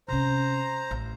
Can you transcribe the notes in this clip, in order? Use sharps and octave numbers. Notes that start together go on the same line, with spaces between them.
C3 C#4 C5 A#5
A1